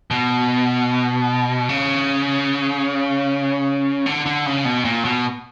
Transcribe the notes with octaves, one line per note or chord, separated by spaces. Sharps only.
B2
C#3
D3
D3
C#3
B2
A#2
B2